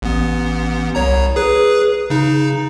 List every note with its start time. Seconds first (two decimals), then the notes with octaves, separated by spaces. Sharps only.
0.02 A1 B3
0.95 C2 C#5 A#5
1.36 G#4 B4
2.10 C#3 D#4